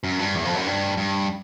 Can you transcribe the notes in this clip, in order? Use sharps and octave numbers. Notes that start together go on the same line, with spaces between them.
F#2
G2
E2
F2
F#2
G2
G2